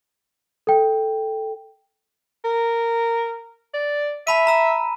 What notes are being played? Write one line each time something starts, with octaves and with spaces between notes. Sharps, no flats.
A4 G5
A#4
D5
E5 A5 B5 D#7
A#5 E6